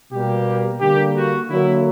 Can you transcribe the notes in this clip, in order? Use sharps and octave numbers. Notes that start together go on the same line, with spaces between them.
B2 G3 A#3 G4
D3 G3 A#3 G4
F#4
D3 F#3 A#3 E4